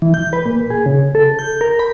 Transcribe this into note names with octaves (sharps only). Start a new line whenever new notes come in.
E3
G6
B4
A#2
G#4
C#3
A4
G6
A#4
B5